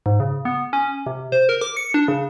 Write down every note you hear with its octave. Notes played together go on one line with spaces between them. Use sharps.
G#2
C#3
B3
C#4
C3
C5
A#4
D6
C#7
D4
C#3